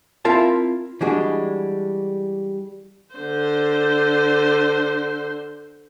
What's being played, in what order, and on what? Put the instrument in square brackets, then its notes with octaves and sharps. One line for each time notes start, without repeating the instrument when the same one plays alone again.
[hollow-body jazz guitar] C4 E4 F4 A#4 E5 A5
E3 G3 G#3 D4 F#4 G#4
[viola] D3 C5